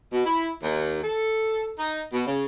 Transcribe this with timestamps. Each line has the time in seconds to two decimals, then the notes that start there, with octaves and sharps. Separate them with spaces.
0.13 B2
0.25 E4
0.63 D#2
1.02 A4
1.77 D#4
2.12 B2
2.26 C#3